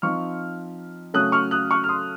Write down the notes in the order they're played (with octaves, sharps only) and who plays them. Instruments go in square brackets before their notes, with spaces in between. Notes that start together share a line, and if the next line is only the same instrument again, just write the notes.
[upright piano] F3 C4 D#4 C#6 F6
C#3 F#3 A3 C#4 D#6 F#6
C#6 F6
D#6 F#6
C#6 F6
F6
C6 D#6